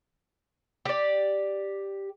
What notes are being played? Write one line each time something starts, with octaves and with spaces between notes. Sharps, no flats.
G4 D5